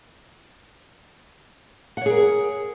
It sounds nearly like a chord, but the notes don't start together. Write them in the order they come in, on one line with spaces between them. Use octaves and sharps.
F#5 C#5 G#4 A#4